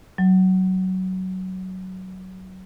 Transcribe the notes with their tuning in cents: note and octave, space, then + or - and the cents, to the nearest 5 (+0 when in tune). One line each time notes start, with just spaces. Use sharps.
F#3 +15